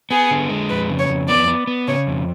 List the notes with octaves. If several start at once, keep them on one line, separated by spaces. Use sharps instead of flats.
B3 G#4
D3
G#3
F2 B4
C#3
C#5
F2
B3 D5
B3
B3
C#3 C#5
F2